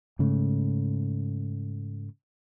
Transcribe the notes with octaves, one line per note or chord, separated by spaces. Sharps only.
G#2 C#3 A3